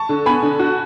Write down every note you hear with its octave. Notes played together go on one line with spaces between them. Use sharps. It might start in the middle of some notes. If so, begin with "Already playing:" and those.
Already playing: A5 C#6
D3
B3 G#5 B5
D3
F#4